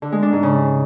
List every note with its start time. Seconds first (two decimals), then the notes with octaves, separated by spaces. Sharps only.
0.02 D3
0.12 G#3
0.22 D4
0.33 G#2
0.43 C#3